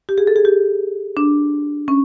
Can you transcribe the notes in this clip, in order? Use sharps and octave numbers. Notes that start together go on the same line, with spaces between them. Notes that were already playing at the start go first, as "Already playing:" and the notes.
G4
G#4
A4
G#4
G4
D4
C#4